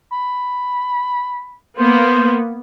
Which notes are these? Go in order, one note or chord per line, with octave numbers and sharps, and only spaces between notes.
B5
A#3 B3 C5